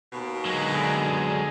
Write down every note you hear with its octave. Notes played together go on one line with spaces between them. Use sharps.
D#2 B2
D3 F#3 G#3 G#4